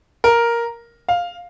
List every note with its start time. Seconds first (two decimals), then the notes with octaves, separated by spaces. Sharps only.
0.24 A#4
1.08 F5